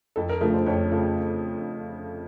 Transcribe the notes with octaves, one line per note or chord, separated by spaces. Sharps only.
F2 A4
A#4
C#3 F3 A3 A#4
C5
F2 C#5
C#3 F3 A3